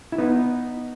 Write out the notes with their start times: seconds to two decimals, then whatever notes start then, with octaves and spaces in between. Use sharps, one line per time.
0.12 E4
0.18 B3 D#4